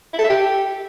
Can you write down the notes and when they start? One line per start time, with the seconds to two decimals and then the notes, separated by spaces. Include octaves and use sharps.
0.13 E4
0.19 A4
0.24 E5
0.30 G4